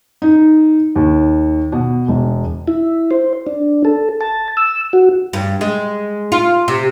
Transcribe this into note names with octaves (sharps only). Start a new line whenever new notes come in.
D#4
D#2
B2
E1
E4
C5
D4
A4
A5
E6
F#4
G2
G#3
F4
C3